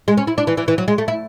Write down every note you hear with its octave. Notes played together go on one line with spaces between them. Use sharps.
G#3
C#4
E4
D4
E3
E3
E3
F#3
G#3
A3
E4